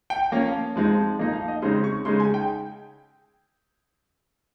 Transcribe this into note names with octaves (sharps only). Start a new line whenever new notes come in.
G5
F3 A#3 C#4 F5
F3 G#3 C4 D#4
F3 A#3 D#4 D#5
F5
D#5
C#3 G#3 C4 D#4 C6
C#6
C#3 G#3 D#4 C6
G#5
G5